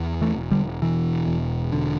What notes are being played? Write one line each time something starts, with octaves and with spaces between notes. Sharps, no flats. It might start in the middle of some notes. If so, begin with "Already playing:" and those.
Already playing: E2
E3 A3
E1
D3 G3
B2 E3
E1
D3